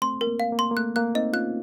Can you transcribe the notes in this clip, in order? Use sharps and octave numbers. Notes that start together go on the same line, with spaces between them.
A3 C4 C6
A#4
A#3
F5
A#3
C6
A#3
A3 F#6
A#3 F#6
C4 D#4 D#5
C#4 F4 F#6